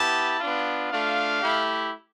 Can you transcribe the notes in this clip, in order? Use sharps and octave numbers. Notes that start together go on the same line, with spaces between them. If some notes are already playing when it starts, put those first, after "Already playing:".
Already playing: B3 E4 G4 A5
B3 D4 F4
A3 D4 F4 F5
A3 E4 G4